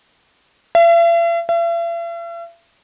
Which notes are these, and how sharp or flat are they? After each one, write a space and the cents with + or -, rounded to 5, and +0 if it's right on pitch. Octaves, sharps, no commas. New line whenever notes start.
E5 +45
E5 +45